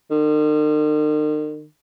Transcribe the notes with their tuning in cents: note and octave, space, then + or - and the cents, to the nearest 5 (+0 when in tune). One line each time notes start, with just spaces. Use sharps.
D#3 -45